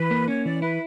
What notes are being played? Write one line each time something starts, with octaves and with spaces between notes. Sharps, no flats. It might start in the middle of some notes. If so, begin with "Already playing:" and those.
Already playing: E3 B4
A#3
C#4 C#5
E3 D5
E4 B4